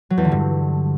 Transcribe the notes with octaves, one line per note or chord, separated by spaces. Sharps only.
F#3
E2
D3
G2